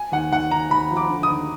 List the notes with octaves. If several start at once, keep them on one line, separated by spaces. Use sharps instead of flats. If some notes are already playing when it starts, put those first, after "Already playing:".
Already playing: G#5
D#2 F#5
D#2 F#5
D#2 A#5
D#2 B5
F3
D6
D3
D#6
D#2